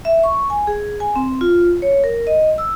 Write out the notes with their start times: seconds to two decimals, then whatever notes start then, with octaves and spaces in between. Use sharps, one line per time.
0.05 E5
0.23 C#6
0.50 G#5
0.67 G#4
1.00 G#5
1.16 C4
1.41 F4
1.82 C#5
2.04 A#4
2.27 D#5
2.58 E6